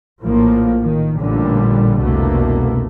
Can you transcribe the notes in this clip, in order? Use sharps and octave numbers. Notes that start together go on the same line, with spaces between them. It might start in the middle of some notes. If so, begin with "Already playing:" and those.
A#1 A2 F3 A#3
D#3
A1 A#2 D3 G3
F1 C2 B2 D3 A3 A#3